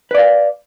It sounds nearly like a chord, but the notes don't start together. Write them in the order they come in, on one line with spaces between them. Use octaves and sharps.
B4 D5 F5